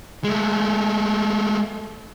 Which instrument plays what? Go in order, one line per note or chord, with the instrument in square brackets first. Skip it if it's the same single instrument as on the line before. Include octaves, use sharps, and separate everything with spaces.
[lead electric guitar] G#3 A3